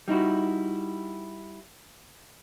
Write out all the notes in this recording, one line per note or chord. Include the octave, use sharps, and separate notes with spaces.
G3 D#4 E4 F#4